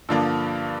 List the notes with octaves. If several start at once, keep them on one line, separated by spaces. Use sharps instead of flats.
G2 D3 F3 A#3 D4